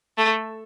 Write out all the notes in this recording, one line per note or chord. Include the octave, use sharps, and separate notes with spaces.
A3